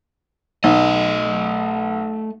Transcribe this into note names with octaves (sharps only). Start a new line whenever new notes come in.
B1 A3 D#5